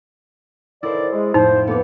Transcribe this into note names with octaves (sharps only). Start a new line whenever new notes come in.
A2 D#3 E4 C5 D5
G#3
F2 A2 D#4 C5
D3 A#3 B3 D#4